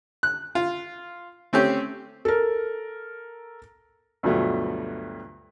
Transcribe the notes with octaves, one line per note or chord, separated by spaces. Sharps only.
F#6
F4
A3 C4 C#4 G4
A4 A#4
D2 G2 B2 F3 F#3 A3